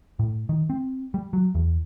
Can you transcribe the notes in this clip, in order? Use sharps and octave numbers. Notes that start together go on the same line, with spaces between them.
A2
D#3
C4
G3
F#3
E2